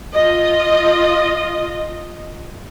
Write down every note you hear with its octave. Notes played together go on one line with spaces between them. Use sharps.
F4 D#5